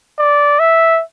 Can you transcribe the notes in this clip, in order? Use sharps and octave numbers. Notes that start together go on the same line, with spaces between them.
D5
E5